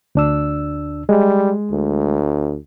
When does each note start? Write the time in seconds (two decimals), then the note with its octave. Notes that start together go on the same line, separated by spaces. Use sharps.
0.15 D2 D4 E6
1.09 G3 G#3
1.71 D2